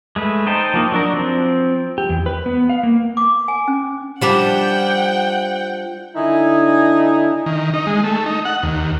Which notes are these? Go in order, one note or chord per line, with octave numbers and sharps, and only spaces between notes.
G#3 A3 B4
D#4 C5 G5 A5
F3 A#3 D#4
F#3 D4 A#4
F3 C4
G4
E2
B4
B3
F5
A#3
D6
G#5
C#4
F3 G3 D4 F#5 G5
D3 D#4 E4 G#5
D#3
D#4
G#3
A3
D#4
F#5
D#2